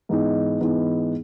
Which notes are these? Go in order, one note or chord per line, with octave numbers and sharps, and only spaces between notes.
G#2 E3 B3 D#4
G#2 E3 B3 D#4